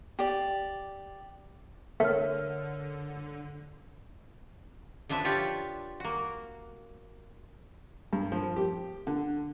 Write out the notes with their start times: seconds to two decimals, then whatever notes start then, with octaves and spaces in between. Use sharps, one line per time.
0.19 G4 D5
2.00 D3 A3 A#4 C#5 F6
5.09 D3 F3 D4 B4 E5
5.24 D4 F4 G4 C#5 D5
6.00 A#3 F#4
8.13 G2
8.32 F3
8.56 G4
9.07 D3